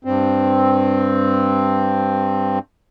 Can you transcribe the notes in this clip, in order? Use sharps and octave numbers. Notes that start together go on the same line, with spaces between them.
G2 C4